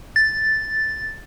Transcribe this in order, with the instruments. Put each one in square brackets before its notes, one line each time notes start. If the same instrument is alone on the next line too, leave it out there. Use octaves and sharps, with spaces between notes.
[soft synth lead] A6